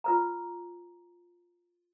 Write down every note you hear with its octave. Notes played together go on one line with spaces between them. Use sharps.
F4 B4 A#5